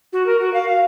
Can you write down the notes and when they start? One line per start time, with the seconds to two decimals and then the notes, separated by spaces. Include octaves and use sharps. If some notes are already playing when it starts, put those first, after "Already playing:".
0.13 F#4
0.26 A#4
0.40 F#4
0.53 F5
0.68 F5